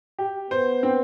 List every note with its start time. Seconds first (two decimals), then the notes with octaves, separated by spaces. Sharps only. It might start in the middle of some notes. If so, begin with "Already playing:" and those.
0.19 G4
0.50 B3 C5
0.83 C4